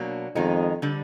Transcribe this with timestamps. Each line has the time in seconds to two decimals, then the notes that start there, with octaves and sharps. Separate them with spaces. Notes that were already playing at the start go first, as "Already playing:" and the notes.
Already playing: B2 F#3 A#3 D4
0.35 F2 D#3 G#3 B3 D#4
0.82 D3 G3